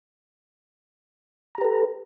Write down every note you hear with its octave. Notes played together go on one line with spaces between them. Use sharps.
G4 A4 B4 A#5